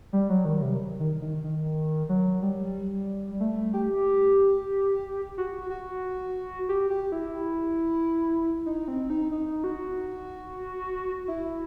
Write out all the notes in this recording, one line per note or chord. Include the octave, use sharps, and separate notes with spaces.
G3
F#3
D#3
C3
D#3
D#3
D#3
F#3
G3
A3
G4
F#4
F#4
G4
G4
E4
D#4
C4
D#4
D#4
F#4
E4